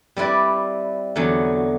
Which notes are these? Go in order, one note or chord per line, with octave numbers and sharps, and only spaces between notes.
G3 C4 E4 B4 D5
E2 D3 F#3